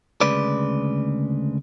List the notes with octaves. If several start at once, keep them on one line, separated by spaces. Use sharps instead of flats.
D2 C#3 G#3 B4 D5